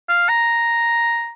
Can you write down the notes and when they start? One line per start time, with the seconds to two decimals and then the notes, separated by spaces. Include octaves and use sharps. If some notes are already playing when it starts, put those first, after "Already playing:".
0.09 F5
0.29 A#5